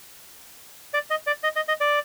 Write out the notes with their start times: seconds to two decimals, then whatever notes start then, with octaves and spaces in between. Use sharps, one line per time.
0.94 D5
1.10 D#5
1.27 D5
1.43 D#5
1.56 D#5
1.68 D#5
1.81 D5